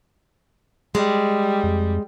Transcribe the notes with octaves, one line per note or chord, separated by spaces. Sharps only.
G3 G#3
F2